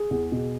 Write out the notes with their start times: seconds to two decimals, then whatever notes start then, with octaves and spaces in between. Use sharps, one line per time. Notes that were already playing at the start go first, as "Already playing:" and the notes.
Already playing: G#4
0.11 E2
0.32 B2